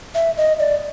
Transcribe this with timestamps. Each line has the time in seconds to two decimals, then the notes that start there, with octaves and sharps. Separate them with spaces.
0.15 E5
0.37 D#5
0.60 D5